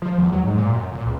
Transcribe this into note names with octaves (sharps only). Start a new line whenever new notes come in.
F3
E2
F#3
G#2
A#2
F#2
A#2
C#2